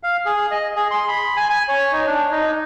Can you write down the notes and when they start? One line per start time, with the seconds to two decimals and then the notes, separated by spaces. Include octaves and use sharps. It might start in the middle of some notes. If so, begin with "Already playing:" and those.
0.03 F5
0.25 G#4
0.51 D#5
0.76 G#4
0.91 C6
1.08 B5
1.37 G#5
1.50 G#5
1.68 C#5
1.92 D#4
2.07 D4
2.31 D#4